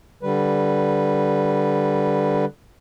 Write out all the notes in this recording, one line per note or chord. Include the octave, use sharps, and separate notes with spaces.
D3 G3 B4